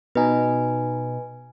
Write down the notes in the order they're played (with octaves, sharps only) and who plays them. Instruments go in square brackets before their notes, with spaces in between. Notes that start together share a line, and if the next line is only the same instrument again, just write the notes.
[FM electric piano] B2 D#4 [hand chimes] B4 G#5